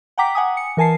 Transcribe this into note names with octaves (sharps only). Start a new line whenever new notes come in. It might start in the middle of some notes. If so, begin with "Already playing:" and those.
F#5 G5 A#5 D6 B6
F#5 G#5 D#6
C#7
E3 A#4 G#5 A5 C7